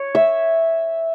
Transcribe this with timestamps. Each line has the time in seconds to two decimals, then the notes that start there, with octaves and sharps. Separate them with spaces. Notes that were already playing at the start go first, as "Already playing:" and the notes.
Already playing: C#5
0.15 E5